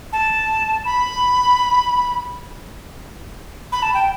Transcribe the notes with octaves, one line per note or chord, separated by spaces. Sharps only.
A5
B5
B5
A5
G5